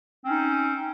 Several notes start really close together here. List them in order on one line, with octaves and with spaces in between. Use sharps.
C4 C#4 D#4